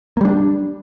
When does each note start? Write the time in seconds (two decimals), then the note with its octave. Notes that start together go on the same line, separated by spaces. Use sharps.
0.17 A#3
0.21 G3
0.25 D4